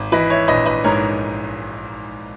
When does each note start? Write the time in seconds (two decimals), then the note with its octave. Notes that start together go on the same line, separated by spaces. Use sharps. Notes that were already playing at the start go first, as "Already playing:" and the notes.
Already playing: G#1
0.12 E3 B4 D#5
0.30 C#5 E5
0.48 A#1 B4 D#5
0.66 B4 D#5
0.84 G#2 A#4 C#5